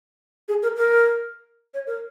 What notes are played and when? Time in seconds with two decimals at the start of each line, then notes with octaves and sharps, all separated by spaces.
0.48 G#4
0.63 A#4
0.77 A#4
1.74 C#5
1.87 A#4